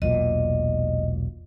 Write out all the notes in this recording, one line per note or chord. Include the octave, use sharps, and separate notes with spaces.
E1 B1 A#2 D#5